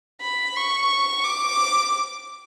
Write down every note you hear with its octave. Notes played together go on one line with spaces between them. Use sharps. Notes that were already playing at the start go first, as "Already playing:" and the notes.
B5
C#6
D6